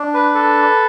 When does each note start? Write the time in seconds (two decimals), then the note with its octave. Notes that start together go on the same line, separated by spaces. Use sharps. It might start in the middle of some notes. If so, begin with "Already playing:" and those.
Already playing: D4
0.14 B4
0.35 A4